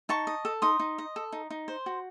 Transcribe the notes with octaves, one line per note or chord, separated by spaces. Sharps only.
D#4 A5 C#6
D#5
A4
D#4 C6 D#6
D#4
D#5
A4
D#4
D#4
C5
F#4